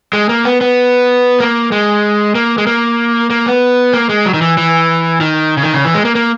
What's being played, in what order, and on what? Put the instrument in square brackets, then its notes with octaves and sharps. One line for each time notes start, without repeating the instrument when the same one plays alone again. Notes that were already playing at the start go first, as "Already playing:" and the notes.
[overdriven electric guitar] G#3
A#3
B3
B3
A#3
G#3
A#3
G#3
A#3
A#3
B3
A#3
G#3
F#3
D#3
E3
E3
D#3
C#3
D#3
C#3
E3
G#3
A#3
A#3